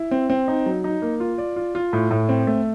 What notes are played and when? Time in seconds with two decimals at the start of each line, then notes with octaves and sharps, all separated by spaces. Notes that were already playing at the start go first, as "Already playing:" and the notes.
Already playing: E4
0.11 C4
0.30 C4
0.48 D#4
0.66 F#3
0.84 D#4
1.02 A#3
1.20 F4
1.38 D5
1.56 F4
1.75 F4
1.93 A2
2.11 A2
2.29 C4
2.47 A3